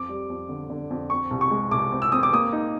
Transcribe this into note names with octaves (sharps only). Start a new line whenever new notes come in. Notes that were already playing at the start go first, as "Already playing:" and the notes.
Already playing: F2 D6
G3
F2
D3
D3
F2
C4 C#6
C2
C#6
G#3
C2 D6
C4
E6
C4 D#6
D6
A#3 D#6
D#4